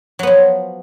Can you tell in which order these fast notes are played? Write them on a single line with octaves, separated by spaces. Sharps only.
F#3 B3 F3